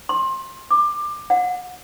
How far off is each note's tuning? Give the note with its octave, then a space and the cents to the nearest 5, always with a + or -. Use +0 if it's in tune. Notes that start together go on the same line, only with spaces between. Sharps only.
C6 +25
D6 +20
F#5 -40